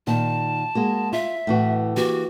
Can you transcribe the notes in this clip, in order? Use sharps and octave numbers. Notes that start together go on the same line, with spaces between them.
A#2 D#3 A5
G#3 A#3 F#4
F4 E5
A2 E3 F#4
E3 A#3 F#4 G4